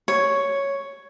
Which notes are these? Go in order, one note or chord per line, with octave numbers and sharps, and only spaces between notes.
C#5